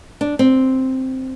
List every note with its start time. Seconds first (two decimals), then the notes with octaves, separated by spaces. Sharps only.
0.21 D4
0.39 C4